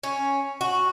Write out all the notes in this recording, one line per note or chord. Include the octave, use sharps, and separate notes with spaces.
C#4
F#4